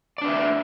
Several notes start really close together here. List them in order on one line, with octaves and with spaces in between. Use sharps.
D5 D4 B4 E5